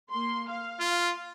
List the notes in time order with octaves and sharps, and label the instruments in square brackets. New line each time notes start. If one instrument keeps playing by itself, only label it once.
[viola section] A#3 C6
F5
[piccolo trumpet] F4